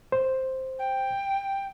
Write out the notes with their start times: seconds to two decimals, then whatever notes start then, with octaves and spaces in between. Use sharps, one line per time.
0.12 C5
0.78 G5